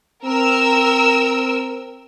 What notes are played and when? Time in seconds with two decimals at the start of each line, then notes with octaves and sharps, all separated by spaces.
0.25 C4 A#4 E6